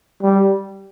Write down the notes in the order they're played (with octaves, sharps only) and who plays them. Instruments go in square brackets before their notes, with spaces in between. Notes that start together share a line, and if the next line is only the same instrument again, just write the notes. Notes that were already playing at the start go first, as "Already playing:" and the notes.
[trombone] G3